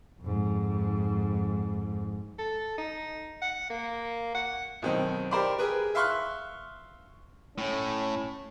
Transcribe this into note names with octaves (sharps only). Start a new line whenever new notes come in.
F2 G#2
A4
D#4
F#5
A#3
F#5
B1 D#3 C4
G4 A#4 C5 D5
G#4 A#4 B4
E5 F5 C6 C#6 F6 F#6
A2 C#4